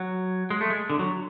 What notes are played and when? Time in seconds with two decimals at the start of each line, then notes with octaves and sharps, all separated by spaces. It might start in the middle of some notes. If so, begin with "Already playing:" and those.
Already playing: F#3
0.50 G#3
0.61 A3
0.70 G#3
0.90 D3
0.99 F#3